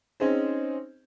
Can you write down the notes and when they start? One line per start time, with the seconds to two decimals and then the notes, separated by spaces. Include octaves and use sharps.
0.20 C4 C#4 D#4 G#4 C5